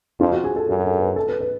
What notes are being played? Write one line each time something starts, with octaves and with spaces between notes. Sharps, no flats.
F2 F4
F#4
G#4
A4
F#2 F#4
A4
B4
A4
B4
B4